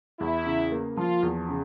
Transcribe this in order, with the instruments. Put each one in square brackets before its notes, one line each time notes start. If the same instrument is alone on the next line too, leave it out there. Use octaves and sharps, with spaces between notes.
[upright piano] E2 [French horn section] E4
[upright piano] C#3
A#3
[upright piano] F3 [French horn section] F4
[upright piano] E2
C#3